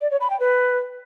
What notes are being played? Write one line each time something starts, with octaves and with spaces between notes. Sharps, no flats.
D5
C#5
B5
G5
B4